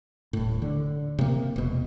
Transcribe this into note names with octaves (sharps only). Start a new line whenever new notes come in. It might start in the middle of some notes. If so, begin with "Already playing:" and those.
D#1 A2
D3
C3 A#3
E1 B2